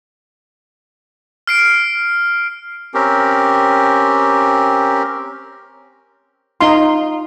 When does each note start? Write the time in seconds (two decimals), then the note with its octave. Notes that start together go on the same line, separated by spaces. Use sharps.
1.47 F6 C7 D7
2.94 C4 C#4 G4 A#4
6.61 D#4 F4 C6